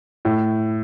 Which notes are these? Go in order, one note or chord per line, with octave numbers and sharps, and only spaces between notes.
A2